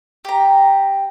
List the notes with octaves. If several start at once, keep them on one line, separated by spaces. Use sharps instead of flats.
G4 A#5